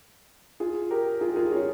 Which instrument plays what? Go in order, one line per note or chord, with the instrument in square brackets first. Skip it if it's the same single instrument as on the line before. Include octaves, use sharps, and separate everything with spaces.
[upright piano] F4 G#4
G4 A#4
F4 G#4
F4 G#4
C#4 F4